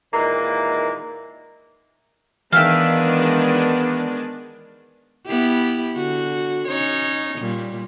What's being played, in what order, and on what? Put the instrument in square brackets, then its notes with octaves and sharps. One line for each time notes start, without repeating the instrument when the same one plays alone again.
[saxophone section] A#2 D#3 E3 G#3 A#3
[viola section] D#3 G#3 D4 [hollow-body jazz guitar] E3 G5 [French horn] B3 [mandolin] E5 F5
[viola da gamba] B3 E4 G4
D3 F#4
C#4 D#4 C#5
A#2 G3